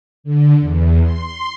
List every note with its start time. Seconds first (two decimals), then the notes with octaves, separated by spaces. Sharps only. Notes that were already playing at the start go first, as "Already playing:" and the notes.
0.24 D3
0.59 E2
1.02 C6